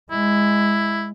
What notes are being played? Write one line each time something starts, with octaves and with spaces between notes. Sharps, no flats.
G#3 E4